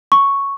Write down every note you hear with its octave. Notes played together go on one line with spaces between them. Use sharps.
C#6